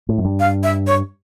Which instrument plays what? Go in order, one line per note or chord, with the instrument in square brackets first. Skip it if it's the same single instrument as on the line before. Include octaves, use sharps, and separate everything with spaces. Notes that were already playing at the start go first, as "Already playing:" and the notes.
[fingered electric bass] A2
F#2
G2
[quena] F5
E5
C#5